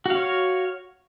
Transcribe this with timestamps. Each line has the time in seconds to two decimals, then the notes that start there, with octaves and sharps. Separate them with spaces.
0.06 F#4
0.10 F5
0.15 C#5